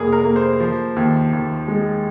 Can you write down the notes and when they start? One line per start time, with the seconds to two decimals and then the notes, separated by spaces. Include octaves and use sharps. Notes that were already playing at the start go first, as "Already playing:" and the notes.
Already playing: F1 A#3 G#4 A#4
0.12 A#4
0.25 A#3
0.36 C5
0.60 F3
0.96 D#2
1.33 D#2
1.68 G#3